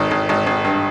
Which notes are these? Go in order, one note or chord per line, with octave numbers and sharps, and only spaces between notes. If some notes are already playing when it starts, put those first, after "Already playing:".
Already playing: G#1 D#3
G#1
G#1
G#1
G2